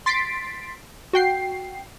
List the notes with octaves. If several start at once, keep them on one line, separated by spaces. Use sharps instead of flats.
C6 A6 B6 C7 D7
F#4 G5 C7